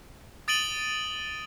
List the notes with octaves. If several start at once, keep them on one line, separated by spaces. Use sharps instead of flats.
D#6 A6 D7 D#7 F#7 G7